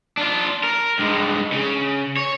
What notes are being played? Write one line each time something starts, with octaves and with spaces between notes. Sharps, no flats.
D4 F4
A#4
G2 G#3
C#3
C#5